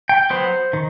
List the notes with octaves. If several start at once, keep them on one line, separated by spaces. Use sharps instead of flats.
G5
F#3 B3 C5
D#3